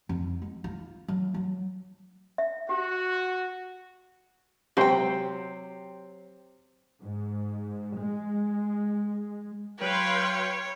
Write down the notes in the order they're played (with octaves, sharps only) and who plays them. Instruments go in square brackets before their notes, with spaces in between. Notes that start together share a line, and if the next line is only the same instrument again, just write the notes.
[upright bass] F2
G#3
F4
F#3
F#3
[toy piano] E5
[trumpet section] F#4 [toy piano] G4
[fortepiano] C3 C5 [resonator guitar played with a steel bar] F#3 G5
[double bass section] G#2
G#3
[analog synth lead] F#3 [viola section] B4 F5 C6 [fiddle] C#5 [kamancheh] G5